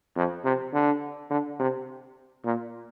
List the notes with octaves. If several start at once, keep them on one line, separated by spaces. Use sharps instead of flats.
F2
C3
D3
D3
C3
A#2